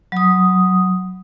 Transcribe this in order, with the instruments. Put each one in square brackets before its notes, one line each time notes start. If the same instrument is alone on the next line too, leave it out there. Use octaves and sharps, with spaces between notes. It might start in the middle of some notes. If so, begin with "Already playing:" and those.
[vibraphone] F#3 D#6